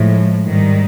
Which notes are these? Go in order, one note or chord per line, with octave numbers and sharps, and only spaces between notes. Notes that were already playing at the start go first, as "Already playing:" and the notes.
Already playing: A2 F3 G#3
G#2 D#3 G3